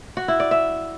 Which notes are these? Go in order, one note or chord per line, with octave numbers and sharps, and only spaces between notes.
F#4
E4
D5
E5